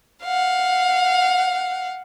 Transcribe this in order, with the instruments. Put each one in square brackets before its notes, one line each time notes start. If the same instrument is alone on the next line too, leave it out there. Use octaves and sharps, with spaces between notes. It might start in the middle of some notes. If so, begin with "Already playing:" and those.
[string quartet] F5 F#5